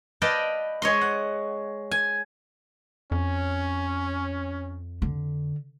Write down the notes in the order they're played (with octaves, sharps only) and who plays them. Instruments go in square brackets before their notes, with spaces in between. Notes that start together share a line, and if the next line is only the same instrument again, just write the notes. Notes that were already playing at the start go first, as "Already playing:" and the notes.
[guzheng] B4 D5 D#5 F5 G5 A5
G#3 C#5 D#5 C6
F#5
G#5
[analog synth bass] F2 [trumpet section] C#4
[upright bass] D3